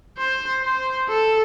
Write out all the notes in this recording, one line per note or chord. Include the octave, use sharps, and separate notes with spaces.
C5
C5
A4